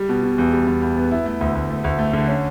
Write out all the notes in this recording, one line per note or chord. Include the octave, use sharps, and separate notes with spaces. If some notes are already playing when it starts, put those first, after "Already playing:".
Already playing: G3
B2
B2
E2
G3
E2
E2
B3
E4
A3
D2
D2
A3
D2
A3
D3
C#4